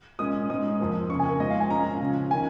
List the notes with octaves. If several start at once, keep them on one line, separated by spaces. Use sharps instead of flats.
A#2 G#3 C#4 D#6
G#2 G#3 C#4 D#6
F2 F3 A#3
C#3 A#3 C#4 C#6
G#5
A#4
G#2 F3 G#3 D#5
F5
G#5
A#2 G#3 C#4 A#5
C#3 F3 C#4
D#3 C#4 G#5